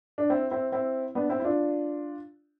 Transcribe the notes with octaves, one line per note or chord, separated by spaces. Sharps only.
D4
C4 E4
C4 E4
C4 E4
B3 D4
C4 E4
E4
D4 F4